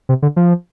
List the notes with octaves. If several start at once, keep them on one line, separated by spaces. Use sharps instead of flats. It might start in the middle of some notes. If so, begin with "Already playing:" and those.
C3
D3
F3